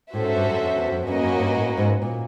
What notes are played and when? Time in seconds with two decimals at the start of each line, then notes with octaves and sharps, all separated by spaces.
0.13 A2 C#4 F#4 A4 C5 E5
0.25 G#2
0.37 G2
0.49 F#2
0.60 F2
0.76 E2
0.92 F2
1.07 F#2 A#3 C#4 F#4 B4 D#5
1.24 F#2
1.39 G2
1.55 A2
1.77 G#2
2.02 A#2